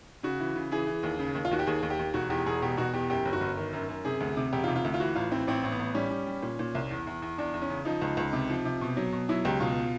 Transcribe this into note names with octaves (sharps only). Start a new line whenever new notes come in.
C#3 F#4
E3
C#3
E3 G#4
E3
D#2
C#3
D#2
F4
D#2 F#4
G4
D#2 G#4
D#2
G4
D#2
E1 F#4
E2 G4
E1 G#4
B2 G4
B2 F#4
E2 G4
F#2 G4
G1
F#4
G1
D#3
F#2
F#2
C3 G#4
D2
C3
E1 G4
F4
C3
F4
D2
F4
E3 F#4
A1 F4
E3 C4
A1 C4
A1
B3
A1
G3 C#4
G3
G3
A#2
A#2
C2
E2
E2
E2
E2 D4
E2
C#4
C#3
F3 D#4
C#2
C#2
C3
F3
C3
B2
F#3
B2
F#3 E4
C#2 G4
B2 F4